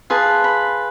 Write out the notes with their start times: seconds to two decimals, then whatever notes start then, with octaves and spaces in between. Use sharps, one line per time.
0.10 F4 G#4 B4 A5
0.44 B5